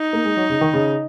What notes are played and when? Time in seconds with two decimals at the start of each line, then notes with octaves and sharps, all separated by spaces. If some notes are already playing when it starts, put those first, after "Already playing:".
Already playing: D#4
0.13 A#3
0.24 G#3
0.37 F#3
0.49 C#3
0.61 D#3
0.73 C#3